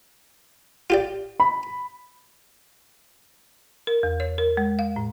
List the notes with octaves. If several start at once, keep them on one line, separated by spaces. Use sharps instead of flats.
F4 G4 D5
B5
A#4
E2
C#5
A#4
G#3
F5
A2